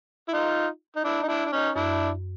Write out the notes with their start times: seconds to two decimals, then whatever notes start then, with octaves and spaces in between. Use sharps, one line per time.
0.28 E4
0.33 D#4 F4
0.96 D#4
1.04 D4 E4
1.23 D#4
1.28 D4 E4
1.45 D4
1.52 C#4 D#4
1.76 F#2 D4 E4